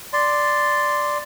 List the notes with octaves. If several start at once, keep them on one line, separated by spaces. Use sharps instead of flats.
D5 C6